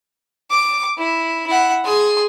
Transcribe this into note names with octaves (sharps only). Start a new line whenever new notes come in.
D6
E4
E4 F#5
G#4 C6